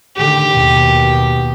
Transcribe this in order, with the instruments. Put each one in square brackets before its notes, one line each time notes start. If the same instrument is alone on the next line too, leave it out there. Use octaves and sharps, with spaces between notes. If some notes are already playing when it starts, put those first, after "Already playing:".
[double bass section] A2 D3 D#3 [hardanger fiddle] G4
[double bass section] D#2 B2